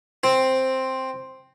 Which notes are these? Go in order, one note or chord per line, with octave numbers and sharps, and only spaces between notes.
C4